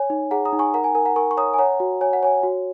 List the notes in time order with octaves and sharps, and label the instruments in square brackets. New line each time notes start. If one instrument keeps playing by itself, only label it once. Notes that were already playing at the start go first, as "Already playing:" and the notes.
Already playing: [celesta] C#5 G#5
D#4
G#4 F#5 A#5
A#5 D#6
D#4
G#5 C#6
A#4 F#5 A#5
G#5
A#4 G#5
F#5 A#5
A#4 G#5 C#6
C#6
C#5 A#5 D#6
G#5
C#5 F#5 A#5
F#4
C#5 G#5
F#5
C#5 G#5
F#4